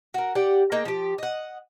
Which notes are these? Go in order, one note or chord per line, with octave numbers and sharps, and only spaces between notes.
F#4 A#4
G4 D5 F#5 G5
A#3 D#4 G#4 G5
F3 G4
D#5 F#5